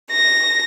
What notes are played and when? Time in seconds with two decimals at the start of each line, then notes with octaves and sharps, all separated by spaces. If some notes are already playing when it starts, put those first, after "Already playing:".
0.11 A#6